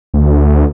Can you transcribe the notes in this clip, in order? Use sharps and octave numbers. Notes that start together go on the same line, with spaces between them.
D2